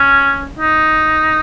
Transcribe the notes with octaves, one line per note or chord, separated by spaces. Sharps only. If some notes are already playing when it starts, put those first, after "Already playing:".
Already playing: C#4
D#4